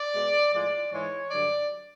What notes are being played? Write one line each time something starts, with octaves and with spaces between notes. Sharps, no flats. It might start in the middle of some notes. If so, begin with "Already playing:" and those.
Already playing: D5
B2 G#3
A2 F3 G#3 D5
G#2 E3 G#3 C#5
G2 D3 F#3 D5